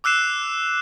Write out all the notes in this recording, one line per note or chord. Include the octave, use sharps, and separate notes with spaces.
D6 E6 F#6 C7 E7